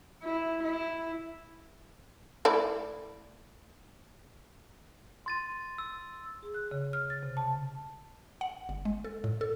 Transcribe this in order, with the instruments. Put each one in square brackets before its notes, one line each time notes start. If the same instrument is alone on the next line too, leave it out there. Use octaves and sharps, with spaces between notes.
[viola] E4
E4
[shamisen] A3 E4 D5
[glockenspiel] C6 A6 D#7
E6
[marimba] G#4
F#6
C#3
F6
A6
C3
A5
[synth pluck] F#5
G1
G#3
A4
A2
A4